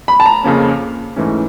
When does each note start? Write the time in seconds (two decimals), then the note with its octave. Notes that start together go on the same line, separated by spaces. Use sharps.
0.08 B5
0.20 A5
0.26 A#5
0.44 F2 C#3 F3 A#3 C#4
1.16 G#2 E3 A3 C#4